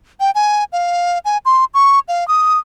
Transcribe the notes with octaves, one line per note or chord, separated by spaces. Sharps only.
G5
G#5
F5
G#5
C6
C#6
F5
D#6